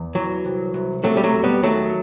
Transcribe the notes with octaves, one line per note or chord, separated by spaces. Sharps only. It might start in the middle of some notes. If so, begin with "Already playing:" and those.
Already playing: E2
E3 F#3
C2
C2
C3 F#3 A3
G3
F#3 A3
E2
G3 B3
D#3 F#3 A3